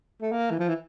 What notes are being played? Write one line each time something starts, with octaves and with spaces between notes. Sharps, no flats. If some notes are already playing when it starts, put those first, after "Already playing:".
A3
A#3
E3
F3
E3